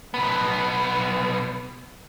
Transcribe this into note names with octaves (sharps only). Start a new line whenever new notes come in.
B1 B3